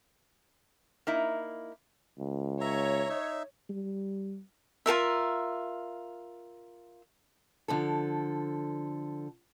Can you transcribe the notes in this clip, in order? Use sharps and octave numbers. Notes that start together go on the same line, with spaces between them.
A#3 D#4 E4
C#2
C#5 E5 A#5
D#4 E5
G3
F4 A4 A#4 E5
D3 F3 A4